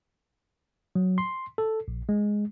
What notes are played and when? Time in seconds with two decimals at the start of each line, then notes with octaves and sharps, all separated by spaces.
0.95 F#3
1.18 C6
1.58 A4
1.88 A#1
2.09 G#3